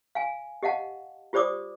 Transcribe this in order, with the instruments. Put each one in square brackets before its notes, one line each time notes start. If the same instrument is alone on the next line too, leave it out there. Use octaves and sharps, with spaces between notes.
[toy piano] F5 G#5
G4 D#5 F5 F#5 A5
F4 G4 C5 D5 D6 D#6